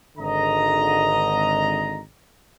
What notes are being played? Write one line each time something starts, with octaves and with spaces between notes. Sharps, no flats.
G#1 D3 D#5 A#5